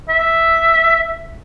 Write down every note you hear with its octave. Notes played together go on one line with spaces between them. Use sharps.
E5